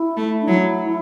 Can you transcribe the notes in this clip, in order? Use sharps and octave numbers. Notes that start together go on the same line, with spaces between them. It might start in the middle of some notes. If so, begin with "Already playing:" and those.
Already playing: E4
A3
D4
F#3 E4